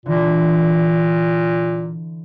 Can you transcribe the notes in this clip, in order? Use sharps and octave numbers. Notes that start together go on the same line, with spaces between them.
A#2 D3 E3